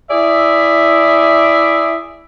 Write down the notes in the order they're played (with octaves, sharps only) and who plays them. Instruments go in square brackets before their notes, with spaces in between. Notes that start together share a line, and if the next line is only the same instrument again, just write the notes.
[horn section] E4 G#4 D5 E5